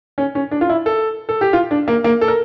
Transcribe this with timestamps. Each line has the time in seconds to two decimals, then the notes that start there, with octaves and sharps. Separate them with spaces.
0.18 C#4
0.35 C#4
0.51 D4
0.61 F4
0.69 E4
0.86 A4
1.29 A4
1.41 G4
1.53 F4
1.71 D4
1.88 A#3
2.04 A#3
2.21 A4
2.28 A#4